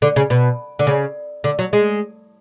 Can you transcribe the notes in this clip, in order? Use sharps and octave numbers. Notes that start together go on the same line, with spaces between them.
D3
C#3
B2
D3
C#3
D3
F#3
G#3